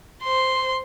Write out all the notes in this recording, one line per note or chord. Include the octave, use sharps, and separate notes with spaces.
C5 C6